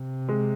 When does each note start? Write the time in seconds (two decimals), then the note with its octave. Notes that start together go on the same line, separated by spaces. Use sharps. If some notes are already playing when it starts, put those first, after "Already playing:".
Already playing: C3
0.29 G#3